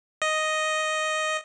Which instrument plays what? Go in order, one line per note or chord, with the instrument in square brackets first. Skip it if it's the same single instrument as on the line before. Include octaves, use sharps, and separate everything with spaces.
[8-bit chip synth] D#5